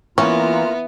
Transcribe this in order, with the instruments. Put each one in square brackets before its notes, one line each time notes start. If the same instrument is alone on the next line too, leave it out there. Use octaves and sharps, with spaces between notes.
[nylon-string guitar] E3 [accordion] A#3 F4 A#5 [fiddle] B3 [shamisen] C#4